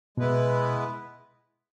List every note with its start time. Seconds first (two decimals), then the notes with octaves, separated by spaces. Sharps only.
0.17 B2 G#3 B3 E4 B4